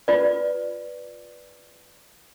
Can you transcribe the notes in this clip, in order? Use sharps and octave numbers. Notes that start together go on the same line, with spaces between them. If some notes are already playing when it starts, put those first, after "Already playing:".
F4 B4 D5